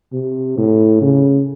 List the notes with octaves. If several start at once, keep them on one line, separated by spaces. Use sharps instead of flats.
C3
A2
C#3